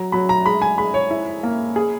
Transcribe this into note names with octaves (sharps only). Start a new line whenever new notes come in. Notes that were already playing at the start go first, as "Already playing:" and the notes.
Already playing: F#3 A#5
F#3 B5
A#5
G#3 B5
G#5
G#3 B5
C#5
E4
A#3
G#4